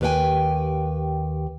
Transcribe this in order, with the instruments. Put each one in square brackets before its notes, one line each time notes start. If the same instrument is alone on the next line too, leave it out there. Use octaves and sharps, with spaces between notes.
[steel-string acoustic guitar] D#2 G4 B4 E5 G5 G#5